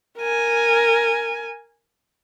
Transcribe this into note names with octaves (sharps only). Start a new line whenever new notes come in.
A#4 G#5